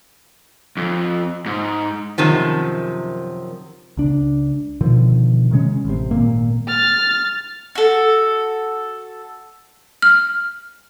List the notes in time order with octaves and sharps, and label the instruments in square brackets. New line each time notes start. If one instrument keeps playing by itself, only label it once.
[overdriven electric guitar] F2
G#2
[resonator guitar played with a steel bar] F#2 C3 D#3 F3
[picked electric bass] C#2 D4
B2 D3 D#3 F3
C3 D#3 G#3 C#4
A1 C3
G#1 A#2 A#3
[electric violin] F6 A6
[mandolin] F#4 A4
[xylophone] F6